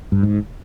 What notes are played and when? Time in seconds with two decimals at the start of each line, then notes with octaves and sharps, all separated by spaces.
0.12 G2
0.23 G#2